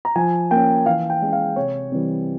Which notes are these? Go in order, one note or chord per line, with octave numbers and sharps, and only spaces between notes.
A#5
F3 G#5
A#3 C#4 G5
E3 F5
G5
G#3 C#4
F5
C3 C#5
E3 G3 C4